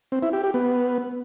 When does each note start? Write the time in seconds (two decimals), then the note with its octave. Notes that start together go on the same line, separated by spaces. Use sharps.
0.12 C4
0.23 E4
0.33 G4
0.44 G4
0.54 B3